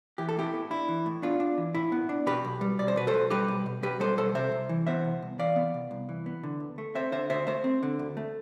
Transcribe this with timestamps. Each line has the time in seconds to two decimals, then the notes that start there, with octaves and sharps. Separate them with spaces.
0.18 E3 G4
0.29 A4
0.37 A2 E4 G4
0.54 B3
0.70 D4 E4
0.88 E3
1.06 A2
1.22 B3 D4 F4
1.40 D4
1.58 E3
1.75 A2 E4
1.92 B3
2.09 D4
2.26 B2 G4 B4
2.44 B1
2.61 G3
2.79 B1 D5
2.88 C5
2.96 B2 B4
3.07 A4 C5
3.14 B1
3.30 G3 G4 B4
3.48 B1
3.66 B2
3.83 B1 G4 B4
4.00 G3 A4 C5
4.18 B1 A4 C5
4.35 C3 C5 E5
4.52 C2
4.69 E3
4.87 B3 C5 E5
5.05 C3
5.22 C2
5.39 E3 D5 F5
5.56 B3
5.74 C3
5.91 C2
6.09 E3
6.26 B3
6.43 D3
6.60 D2
6.78 A3
6.95 C4 C5 E5
7.12 D3 C5 E5
7.30 D2 C5 E5
7.47 A3 C5 E5
7.64 C4
7.83 D3
7.99 D2
8.17 A3